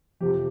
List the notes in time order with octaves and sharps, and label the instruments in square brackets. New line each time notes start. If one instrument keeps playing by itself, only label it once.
[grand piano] F2 C3 F3 G4